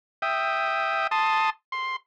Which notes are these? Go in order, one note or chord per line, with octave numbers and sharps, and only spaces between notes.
E5 G5 D#6
A5 C6 D#6
C6